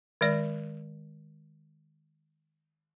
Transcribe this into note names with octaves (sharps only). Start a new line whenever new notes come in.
D#3 G#3 D5